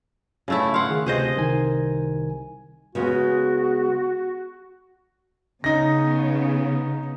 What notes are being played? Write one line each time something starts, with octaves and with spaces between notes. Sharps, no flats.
C#3 A3 E4
F5 F#5 C6
D#3 G#4
D2 C3 G#4 C5 D#5
C2 D#3 G#5
C#3 G#3 B3 F#4
C#3 B3 D#4 A#6